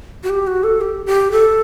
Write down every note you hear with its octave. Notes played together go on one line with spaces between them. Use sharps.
F#4
G4
F#4
A4
G4
G4
A4